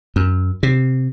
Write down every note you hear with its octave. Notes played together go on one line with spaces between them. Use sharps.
F#2
C3